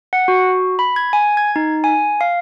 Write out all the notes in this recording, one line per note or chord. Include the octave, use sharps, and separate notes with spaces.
F#5
F#4
B5
G#6
G#5
G#6
D#4
G#5
F5